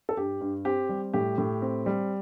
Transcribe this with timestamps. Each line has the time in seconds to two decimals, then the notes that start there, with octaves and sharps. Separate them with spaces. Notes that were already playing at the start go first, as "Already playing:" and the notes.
0.09 A4
0.17 G2 G4
0.41 G2
0.65 C4 G4
0.89 G3
1.14 A2 G4
1.38 A2
1.62 C4
1.86 G3